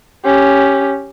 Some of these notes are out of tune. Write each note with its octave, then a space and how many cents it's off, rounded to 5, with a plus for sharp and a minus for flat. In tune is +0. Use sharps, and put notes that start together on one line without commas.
C#4 +0 G4 +0